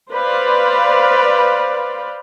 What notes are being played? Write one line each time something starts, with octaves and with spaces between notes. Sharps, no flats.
B4 C5 D5 F5